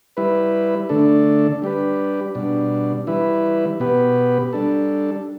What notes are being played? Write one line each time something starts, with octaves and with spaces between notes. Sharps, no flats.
G3 E4 B4
D3 A3 D4 A4
G3 D4 G4 B4
B2 G3 D4
E3 G3 E4 B4
B2 B3 G4 B4
G3 D4 A4